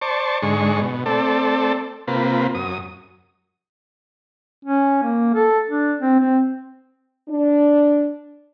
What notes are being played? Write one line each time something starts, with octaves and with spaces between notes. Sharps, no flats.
C5 D5 A5 C#6
G#2 D3 G#3 C#6
B2
A3 C4 A4 D5
C3 A#3 F4 B4
F#2 D#6
C#4
A#3
A4
D4
C4
C4
D4